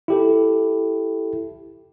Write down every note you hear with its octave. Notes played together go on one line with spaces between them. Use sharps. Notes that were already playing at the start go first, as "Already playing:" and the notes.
E4 G4 A4